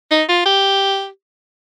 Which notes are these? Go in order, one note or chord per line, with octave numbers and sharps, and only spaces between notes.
D#4
F4
G4